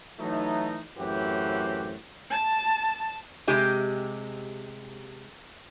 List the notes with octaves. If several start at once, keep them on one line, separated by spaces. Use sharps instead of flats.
E3 F#3 A3 D#4
F#2 A2 E3 C4 F#4 G4
A5
C3 G#3 G4 D#5